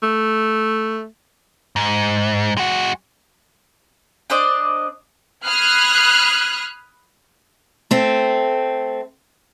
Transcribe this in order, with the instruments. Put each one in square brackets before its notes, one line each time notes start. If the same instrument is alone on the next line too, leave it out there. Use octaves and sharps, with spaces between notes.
[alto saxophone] A3
[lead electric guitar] G#2
G#3 F#4
[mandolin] D4 C5 D5 D#5
[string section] B5 D#6 F6 F#6 G#6 C7
[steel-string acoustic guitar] A3 C4